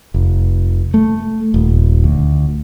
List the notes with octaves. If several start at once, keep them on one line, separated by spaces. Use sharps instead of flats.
F1
A3
D#1
D2